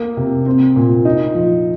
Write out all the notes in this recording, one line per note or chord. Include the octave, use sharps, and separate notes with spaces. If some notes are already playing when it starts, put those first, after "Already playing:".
Already playing: A#3
C3
C4
A#2
D#4
F3